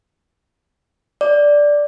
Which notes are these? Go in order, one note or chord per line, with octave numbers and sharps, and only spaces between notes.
D5